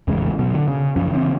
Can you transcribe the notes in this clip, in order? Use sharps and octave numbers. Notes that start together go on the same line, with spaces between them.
E1 A1 G#2 C#3
B2 F#3
D3
C#3
F#2 C#3 F3 C#4
C#3 E3 C4